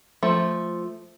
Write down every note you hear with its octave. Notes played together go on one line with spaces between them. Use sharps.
F3 A3